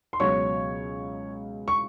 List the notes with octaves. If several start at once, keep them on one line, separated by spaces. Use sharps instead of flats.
C6
C#2 B2 F#3 C#5 C#6
C#6